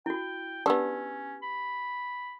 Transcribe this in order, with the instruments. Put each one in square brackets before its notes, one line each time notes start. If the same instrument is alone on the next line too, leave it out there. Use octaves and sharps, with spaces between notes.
[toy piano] E4 F#4 [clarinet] G5
[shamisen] B3 D4 [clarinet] C#4 [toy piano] G4 E6
[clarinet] B5